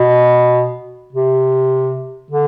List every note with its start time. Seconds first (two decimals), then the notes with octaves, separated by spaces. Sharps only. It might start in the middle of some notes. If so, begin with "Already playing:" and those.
Already playing: B2
1.13 C3
2.31 D3